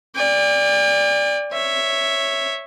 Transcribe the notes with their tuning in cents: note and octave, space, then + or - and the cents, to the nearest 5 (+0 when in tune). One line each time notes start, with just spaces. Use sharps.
D5 +0 G5 +45
C#5 +0 E5 +0